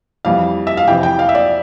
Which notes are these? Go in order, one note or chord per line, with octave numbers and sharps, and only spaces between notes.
F2 E3 G3 F5
E5
F5
F2 C3 E3 G5
G5
F5
E5
D5